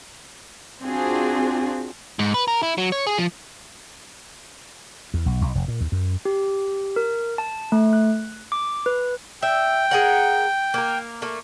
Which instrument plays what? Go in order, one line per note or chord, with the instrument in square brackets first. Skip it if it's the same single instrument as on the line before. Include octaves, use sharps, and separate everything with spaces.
[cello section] C4 D4 F4 F#4 G#4
[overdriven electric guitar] G#2
B4
A#4
E4
F#3
C#5
G#4
F3
[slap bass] E2
B1
B1
F1
A#2
D#2
F#2
[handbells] G4
A#4
A5
A3
F#6
D6
B4
[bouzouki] E5 [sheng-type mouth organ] G5
[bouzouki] G#4 A#4 F#5
A#3 A#4
A3 A#3